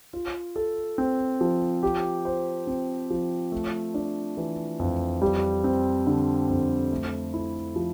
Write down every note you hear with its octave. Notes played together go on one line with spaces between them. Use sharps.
F4
A4
C4
F3
G4
C5
C4
F3
A3
D4
E3
F2
G3
C4
D3
F2
A3
E4
F3